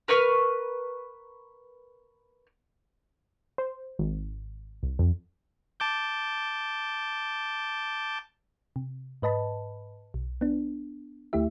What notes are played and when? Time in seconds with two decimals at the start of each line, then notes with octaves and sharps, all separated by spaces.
0.08 A#4 B4 C#6 F6
3.58 C5
3.99 G#1
4.83 C2
4.99 F2
5.80 A5 D6 G6
8.76 C3
9.22 G#2 B4 D#5 A5 B5
10.14 B1
10.41 B3 D4
11.33 D2 A3 E4 G4 E5